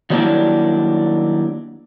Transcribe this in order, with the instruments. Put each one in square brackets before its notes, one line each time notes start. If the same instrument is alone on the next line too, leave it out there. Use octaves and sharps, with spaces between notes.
[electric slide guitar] D#3 F#3 G3 A#3 D4 E4